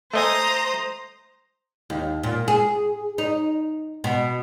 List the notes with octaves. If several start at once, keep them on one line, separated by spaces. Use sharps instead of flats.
A3 C5 D#5 G#5 A#5 D#6
D#2
A#2
G#4
D#4
B2